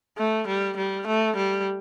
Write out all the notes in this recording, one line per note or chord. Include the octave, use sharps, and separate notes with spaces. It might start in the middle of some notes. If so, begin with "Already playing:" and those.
A3
G3
G3
A3
G3